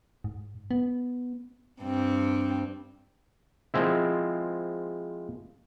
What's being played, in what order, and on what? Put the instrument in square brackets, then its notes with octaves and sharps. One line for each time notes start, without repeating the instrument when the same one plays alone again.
[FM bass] G#2
B3
[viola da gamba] G2 C4
[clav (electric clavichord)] F3 G#3 C4 E4